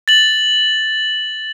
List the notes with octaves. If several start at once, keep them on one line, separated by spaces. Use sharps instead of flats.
A6 F#7